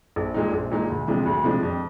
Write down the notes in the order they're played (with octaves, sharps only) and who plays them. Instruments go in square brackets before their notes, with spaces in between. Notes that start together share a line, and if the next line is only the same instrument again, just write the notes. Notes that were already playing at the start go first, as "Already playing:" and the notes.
[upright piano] A#1
A#2 G#3 D#4
A#1
A#2 G#3 D#4
D2
C3 F3 G#3 D4
D2
C3 F3 G#3 D4
F2